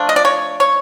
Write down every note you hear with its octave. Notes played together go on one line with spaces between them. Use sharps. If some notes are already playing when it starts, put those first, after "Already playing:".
Already playing: F3 A3 D4 F4
D#5
D5
C#5
C#5